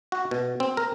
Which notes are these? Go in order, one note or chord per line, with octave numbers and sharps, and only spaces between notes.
F#4
B2
C4
A#4